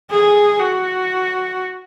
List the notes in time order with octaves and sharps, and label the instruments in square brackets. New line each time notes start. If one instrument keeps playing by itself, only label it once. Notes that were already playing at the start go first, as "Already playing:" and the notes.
[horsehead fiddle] G#4
F#4